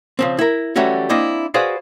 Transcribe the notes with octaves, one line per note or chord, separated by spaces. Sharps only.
C#3 F3 C4
E4 A#4
E3 F#3 G3 A3 C#4 F#4
A#3 C4 D4 E4 D#5
F#4 G#4 B4 C5 D5 F5